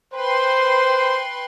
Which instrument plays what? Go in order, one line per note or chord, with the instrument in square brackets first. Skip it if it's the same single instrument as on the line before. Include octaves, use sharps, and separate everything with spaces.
[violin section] B4 G5 C6 [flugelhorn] C5